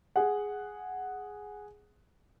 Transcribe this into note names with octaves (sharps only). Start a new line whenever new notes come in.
G#4 F#5